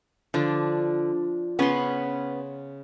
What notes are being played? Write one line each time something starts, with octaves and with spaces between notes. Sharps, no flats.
D3 F3 D4 F4
C#3 B3 C#4 B4 F#5 C6